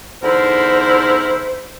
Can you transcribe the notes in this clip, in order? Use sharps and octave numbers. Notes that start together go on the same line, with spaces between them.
E2 D3 D#4 E4 A#4 C5